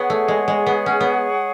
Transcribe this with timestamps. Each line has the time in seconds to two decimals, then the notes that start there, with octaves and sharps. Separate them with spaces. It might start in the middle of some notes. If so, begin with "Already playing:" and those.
Already playing: B3 G#4 C#5 F#5 C#6
0.10 A3
0.28 G#3
0.48 G#3
0.66 B3
0.86 C#4
1.01 B3